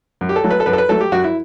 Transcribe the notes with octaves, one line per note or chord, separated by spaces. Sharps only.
F#2
G4
A4
F#3 A3
B4
A4
F#2 B4
A4
B4
F#3 A3 A4
G4
F#2 F#4
E4